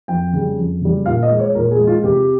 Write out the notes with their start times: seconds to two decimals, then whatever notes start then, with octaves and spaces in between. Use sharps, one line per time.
0.08 F2 G5
0.33 C#3 G3
0.57 F2
0.82 C#3 G3
1.06 A#2 F5
1.23 D#5
1.30 G#3
1.39 C#5
1.55 A#2 A#4
1.71 G#4
1.79 G#3
1.87 F4
2.04 C3 G4